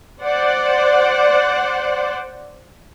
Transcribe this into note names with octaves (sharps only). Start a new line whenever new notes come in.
C5 D5 F#5